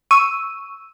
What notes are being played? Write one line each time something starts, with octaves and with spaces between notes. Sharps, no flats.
C#6 E6 D#7